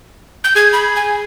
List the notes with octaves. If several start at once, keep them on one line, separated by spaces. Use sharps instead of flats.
G6
G#4 G#6
B5
G#5